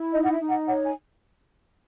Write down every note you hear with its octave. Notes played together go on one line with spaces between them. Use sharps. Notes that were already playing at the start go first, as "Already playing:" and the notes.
Already playing: E4
D#4 D#5
F#5
E5
D#4
F#5
C#5 F#5
G#5